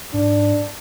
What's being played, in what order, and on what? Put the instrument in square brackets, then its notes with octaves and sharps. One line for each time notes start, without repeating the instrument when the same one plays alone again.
[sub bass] G#2 [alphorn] D4